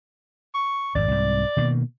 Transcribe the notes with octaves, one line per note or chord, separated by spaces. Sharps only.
C#6
G#1 F2 D5
C2 G#2
B2 D#3 A#3